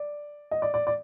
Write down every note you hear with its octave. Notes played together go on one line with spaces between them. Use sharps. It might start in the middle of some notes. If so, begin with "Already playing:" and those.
Already playing: D5
D#5
D5
D5
D5